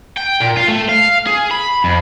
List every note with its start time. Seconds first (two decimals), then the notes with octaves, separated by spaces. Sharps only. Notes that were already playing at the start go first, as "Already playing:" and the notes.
0.17 G5
0.41 A#2
0.57 F4
0.68 A3
0.89 F5
1.27 G#4
1.51 B5
1.84 F2